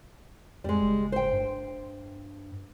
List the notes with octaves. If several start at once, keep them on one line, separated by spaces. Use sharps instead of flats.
F2 G3 G#3
F#1
C5 G5
G2